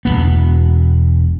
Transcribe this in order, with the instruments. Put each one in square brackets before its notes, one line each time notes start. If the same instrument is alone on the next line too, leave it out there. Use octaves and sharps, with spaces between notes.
[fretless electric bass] E1 E2 B3